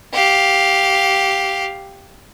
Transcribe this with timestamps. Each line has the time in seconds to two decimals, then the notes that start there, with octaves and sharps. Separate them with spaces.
0.13 G4 F5